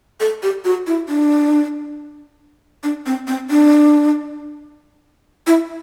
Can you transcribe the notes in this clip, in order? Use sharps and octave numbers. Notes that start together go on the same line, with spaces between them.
A4
G4
F#4
E4
D4
D4
C4
C4
D4
E4